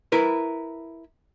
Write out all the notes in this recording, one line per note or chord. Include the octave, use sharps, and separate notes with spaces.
E4 A#4 B4